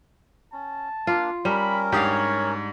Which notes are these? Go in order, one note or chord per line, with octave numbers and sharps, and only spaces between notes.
C#4 A5
A#3 D4 F4 F5
G3 C#4 A#4 B5
G#2 D4 G4 C#5 F5 D#6